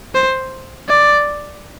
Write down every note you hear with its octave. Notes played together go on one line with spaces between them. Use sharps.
C5
D5